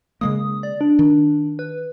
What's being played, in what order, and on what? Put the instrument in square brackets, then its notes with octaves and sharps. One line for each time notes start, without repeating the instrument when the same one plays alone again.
[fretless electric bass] C#3 G#3 A#3 [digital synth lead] D#6
[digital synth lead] D5
D4
[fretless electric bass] D#3
[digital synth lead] B4